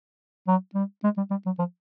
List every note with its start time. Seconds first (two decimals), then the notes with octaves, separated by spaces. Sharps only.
0.48 F#3
0.75 G3
1.04 G#3
1.17 G3
1.31 G3
1.46 F#3
1.59 F3